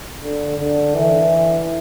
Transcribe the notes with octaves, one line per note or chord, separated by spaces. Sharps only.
D3
D3
E3